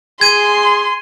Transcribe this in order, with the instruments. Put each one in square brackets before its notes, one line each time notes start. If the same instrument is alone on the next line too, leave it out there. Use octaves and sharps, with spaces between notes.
[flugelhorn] G#4 [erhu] C6 [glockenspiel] G#6 D#7